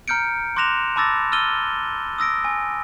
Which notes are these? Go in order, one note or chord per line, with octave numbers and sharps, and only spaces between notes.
A#5 F6 G6 C#7 D7
C6 D6 F#6 A#6 E7 F7
A5 B5 D6 E6 A6 A#6
E6 F6 A6 D#7 G7
D#6 E6 A#6 D7
G#5